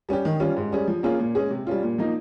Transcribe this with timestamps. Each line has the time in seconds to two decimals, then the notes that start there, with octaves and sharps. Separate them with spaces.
0.09 G3 C#4 G4
0.25 D#3
0.40 G3 C#4 F4
0.57 G#2
0.72 G3 C#4 G#4
0.88 F3
1.03 A#3 C#4 F4 G#4
1.20 A#2
1.35 G#3 C#4 G#4
1.51 C3
1.67 G3 C#4 F4
1.83 A#2
1.98 F3 A#3 D#4